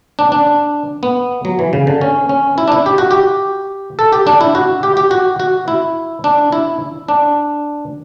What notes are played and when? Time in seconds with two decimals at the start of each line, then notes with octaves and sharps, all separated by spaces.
0.19 D4
0.32 D4
1.03 B3
1.45 F#3
1.59 E3
1.73 C#3
1.87 D3
2.01 C#4
2.29 C#4
2.58 E4
2.68 D4
2.72 E4
2.86 G4
2.98 F#4
3.11 G4
3.99 A4
4.13 G4
4.27 D4
4.41 E4
4.55 F#4
4.83 G4
4.97 G4
5.11 F#4
5.40 F#4
5.68 E4
6.24 D4
6.52 E4
7.08 D4